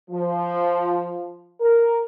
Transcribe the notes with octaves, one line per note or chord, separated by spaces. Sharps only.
F3
A#4